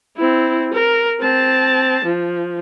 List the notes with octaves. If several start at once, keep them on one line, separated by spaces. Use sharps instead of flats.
C4 E4
A#4
C4 A5
F3